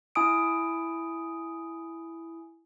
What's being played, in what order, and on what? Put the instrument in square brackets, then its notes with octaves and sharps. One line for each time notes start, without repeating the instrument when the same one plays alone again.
[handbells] E4 G#5 D#6 D7